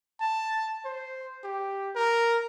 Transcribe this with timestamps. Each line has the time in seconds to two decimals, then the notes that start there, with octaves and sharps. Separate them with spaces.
0.20 A5
0.85 C5
1.44 G4
1.95 A#4